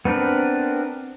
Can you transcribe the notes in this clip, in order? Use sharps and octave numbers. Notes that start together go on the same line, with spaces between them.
B3 C4 D4 A#4 B4